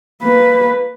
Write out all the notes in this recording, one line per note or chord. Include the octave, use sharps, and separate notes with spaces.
A#3 B4